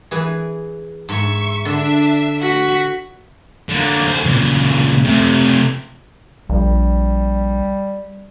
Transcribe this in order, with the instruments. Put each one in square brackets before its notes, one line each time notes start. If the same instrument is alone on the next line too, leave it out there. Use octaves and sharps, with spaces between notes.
[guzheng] E3 G#4 B4
[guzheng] G#2 [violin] E5 C#6
[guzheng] D3 [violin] D4 E5
[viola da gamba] F#4 [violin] B6
[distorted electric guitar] D3 A#3
D#2 C5
A#2 C#3
C3 A3
[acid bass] A#1 [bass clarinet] G3